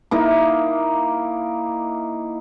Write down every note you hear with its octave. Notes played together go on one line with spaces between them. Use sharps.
A#3 D#4 E4